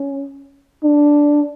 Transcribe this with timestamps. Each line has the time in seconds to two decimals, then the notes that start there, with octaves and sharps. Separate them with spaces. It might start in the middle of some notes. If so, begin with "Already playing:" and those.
Already playing: C#4
0.83 D4